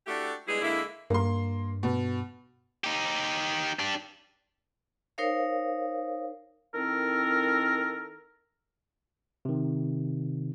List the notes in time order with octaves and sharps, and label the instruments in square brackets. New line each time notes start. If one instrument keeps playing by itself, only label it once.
[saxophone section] A3 D4 E4 F#4 G4
G3 G#3 B3 D4 E4 G#4
D3 G#3 A#3 E4
[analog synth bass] G2 [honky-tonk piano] A#3 C6
[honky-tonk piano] B2
[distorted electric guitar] D#4 G4
D4 G4
[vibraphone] D#4 A#4 C5 C#5 F5
[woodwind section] D#3 C4 E4 A4 A#4
[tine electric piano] C3 D#3